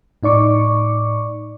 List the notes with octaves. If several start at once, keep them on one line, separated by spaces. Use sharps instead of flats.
A2 D#4 D5 C#6 D6